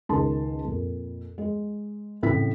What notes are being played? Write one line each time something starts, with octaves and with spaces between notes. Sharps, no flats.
C#2 D#3 A5 C6
F2 A#2
G#3
A2 C#3 E3 C4 E4 B6